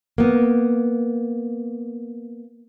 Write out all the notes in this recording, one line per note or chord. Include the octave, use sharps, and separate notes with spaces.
A#3 B3